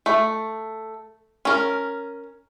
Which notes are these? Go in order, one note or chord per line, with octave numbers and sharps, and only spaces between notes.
A3
C#4 A#4